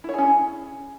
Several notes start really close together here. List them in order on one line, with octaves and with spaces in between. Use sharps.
E4 C#5 G#4 C#4